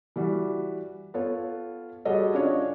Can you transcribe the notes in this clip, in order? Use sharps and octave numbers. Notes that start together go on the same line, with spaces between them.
E3 G3 F#4
B3 F4 A4 C#5
G3 F#4 G#4 A4 C#5 D#5
C#4 D4 F4 C#5 D#5